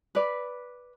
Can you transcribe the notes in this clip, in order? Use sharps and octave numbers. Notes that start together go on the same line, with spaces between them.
B4 D5